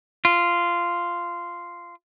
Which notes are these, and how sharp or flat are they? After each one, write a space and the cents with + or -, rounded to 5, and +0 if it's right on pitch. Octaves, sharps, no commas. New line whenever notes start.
F4 -10